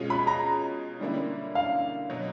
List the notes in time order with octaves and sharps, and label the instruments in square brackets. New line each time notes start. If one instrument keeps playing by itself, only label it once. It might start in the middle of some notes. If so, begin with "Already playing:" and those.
Already playing: [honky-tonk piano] B2 G#3 C#4 F4 G#4
[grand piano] B5
A#5
[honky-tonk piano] D3 G3 A#3 C#4 E4
[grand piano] F5
[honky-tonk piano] B2 F#3